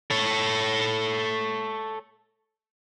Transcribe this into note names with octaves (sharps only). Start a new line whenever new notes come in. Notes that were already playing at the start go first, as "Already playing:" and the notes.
A4 C#5